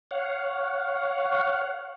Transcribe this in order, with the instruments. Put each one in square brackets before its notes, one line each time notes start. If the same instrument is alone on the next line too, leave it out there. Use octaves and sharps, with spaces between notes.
[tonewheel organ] C#5 F5 F#5